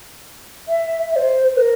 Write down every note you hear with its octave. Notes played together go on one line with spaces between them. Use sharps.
E5
E5
C5
C5
A#4